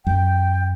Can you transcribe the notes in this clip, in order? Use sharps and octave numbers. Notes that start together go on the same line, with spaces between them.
F#2 G5